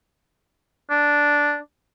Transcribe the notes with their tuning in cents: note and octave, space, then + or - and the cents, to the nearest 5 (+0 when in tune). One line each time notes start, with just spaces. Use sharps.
D4 -5